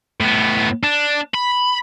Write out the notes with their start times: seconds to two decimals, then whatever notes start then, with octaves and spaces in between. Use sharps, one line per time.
0.21 A2 B3
0.83 D4
1.34 B5